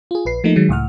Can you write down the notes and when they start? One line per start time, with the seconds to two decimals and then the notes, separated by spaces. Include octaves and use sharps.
0.11 F4 G#4
0.25 A#1 B4 C7
0.44 F3 A3 A#3 D#4
0.56 D#3 F#3 G#3
0.69 C#2 A2 F#5 F6